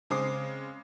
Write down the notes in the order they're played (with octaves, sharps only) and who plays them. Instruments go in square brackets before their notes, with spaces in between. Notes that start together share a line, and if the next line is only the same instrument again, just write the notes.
[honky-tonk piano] C#3 G#3 C4 D6 D#6 C7